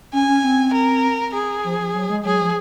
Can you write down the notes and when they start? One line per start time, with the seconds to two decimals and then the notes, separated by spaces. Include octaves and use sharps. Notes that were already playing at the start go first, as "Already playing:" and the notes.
0.13 C#4 G#5
0.28 C#4
0.44 C4
0.74 A#4
1.34 G#4
1.64 F3
1.79 F3
1.94 F#3
2.10 G#3
2.25 F#3 G#4
2.40 F3